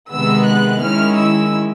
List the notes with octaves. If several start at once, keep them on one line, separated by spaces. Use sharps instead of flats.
C3 D#3 G#3 B3 E6
F#6
D#3 G#3 C#4 E4 F6
E6